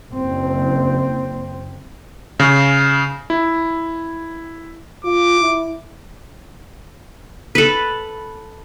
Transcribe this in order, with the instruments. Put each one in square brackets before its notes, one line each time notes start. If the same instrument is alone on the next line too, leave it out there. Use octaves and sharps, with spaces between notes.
[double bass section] F#1 [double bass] C4
[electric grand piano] C#3
E4
[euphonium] F4 [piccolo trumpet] D6
[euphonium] E4
[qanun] A4 B4